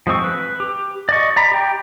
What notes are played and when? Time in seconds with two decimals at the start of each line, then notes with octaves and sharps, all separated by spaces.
0.07 F3 G#3 C4 C#6
0.24 B4
0.60 G4
1.09 D5 D#5 C#6
1.36 D5 A#5 B5
1.52 G4 G5